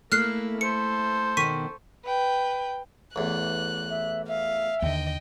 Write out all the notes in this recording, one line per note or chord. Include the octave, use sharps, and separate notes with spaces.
A3 A#3 E4 F6 F#6 C7
A4 C5 C#7
B2 D#3 C#6 B6 D#7
B4 G5
A1 E2 F#6
E5
E5 F5
D#2 D3 D#5 G5